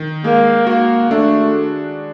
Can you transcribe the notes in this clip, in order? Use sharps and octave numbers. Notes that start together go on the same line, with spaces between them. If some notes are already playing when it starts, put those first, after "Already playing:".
Already playing: D#3
G#3 A#3
A#3 F#4
A3 D4